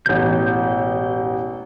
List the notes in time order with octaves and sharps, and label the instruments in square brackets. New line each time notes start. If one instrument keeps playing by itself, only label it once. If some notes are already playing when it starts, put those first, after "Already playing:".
[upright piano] E1 A1 [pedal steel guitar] G6